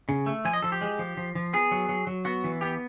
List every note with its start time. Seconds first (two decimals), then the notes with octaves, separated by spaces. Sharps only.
0.09 C#3
0.26 A3
0.45 F3 G#5
0.53 D#5
0.62 F3 A4
0.72 G4
0.81 G#3
0.99 F3
1.17 F3
1.35 F3
1.53 B3 G#4
1.71 F#3
1.89 F#3
2.07 F#3
2.25 B3 F#4
2.44 E3
2.61 B3 G4